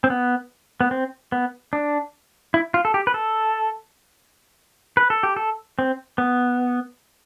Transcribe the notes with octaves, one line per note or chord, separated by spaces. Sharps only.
C4
B3
B3
C4
B3
D4
E4
F4
A4
G4
B4
A4
B4
A4
G4
A4
C4
B3